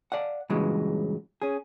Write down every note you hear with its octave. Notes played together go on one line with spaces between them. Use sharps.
D5 F5 F#5
G2 A#2 C#3 E3 F#3 G#3
C#4 G#4